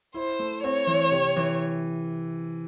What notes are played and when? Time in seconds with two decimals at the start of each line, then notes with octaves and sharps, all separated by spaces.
0.14 E4 C5
0.39 A3
0.63 C4 C#5
0.87 E3
1.11 C3
1.36 E3